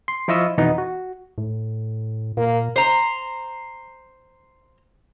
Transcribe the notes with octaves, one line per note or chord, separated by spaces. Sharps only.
C6
F3 E4 F4 D#5 C#6 E6
F2 B2 E3 B3 D#4
F#4
A2
A#2 A#3
C5 A#5